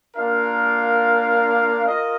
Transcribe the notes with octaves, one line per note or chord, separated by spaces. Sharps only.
A#3 D4 F4 A#4 F5
F4 A#4 D#5